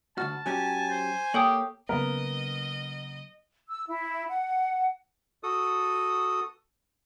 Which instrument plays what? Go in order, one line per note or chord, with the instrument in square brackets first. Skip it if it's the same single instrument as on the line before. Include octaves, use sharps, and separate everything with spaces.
[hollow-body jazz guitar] D2 G#2 F#4 [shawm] A5 [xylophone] F6
[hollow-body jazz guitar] F#3 C#4 G4 [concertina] G#5
[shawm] C5
[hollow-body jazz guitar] A#3 C#5 [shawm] G4 [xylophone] A4 G5 D#6
[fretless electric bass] C#3 F#3 A#3 [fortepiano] B3 A#4 [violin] D#5
[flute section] E6
E4
F#5
[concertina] F#4 A4 D#6